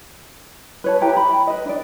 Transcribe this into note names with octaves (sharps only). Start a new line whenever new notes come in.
B4 C#5 A5
E4 G4 B4 A#5
B5
B4 D#5
D4 D5